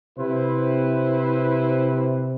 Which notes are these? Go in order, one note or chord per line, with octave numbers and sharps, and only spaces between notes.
C3 E4 B4 C5